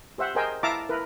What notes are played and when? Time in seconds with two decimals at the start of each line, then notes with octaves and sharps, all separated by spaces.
0.18 G4 C5 E5 F#5
0.35 G#4 A#4 C5 D#5 G5 G#5
0.63 E4 E5 F5 A5 A#5 D6
0.89 E4 A#4 B4